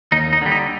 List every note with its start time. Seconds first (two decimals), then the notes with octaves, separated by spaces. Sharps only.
0.12 D#2 D#4
0.33 D#4
0.41 D3 G3
0.52 D#4